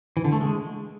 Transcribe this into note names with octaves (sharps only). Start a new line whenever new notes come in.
E3
D3
A3
G#3